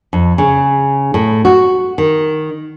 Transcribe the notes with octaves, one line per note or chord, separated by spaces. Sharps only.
F2
C#3
A2
F#4
D#3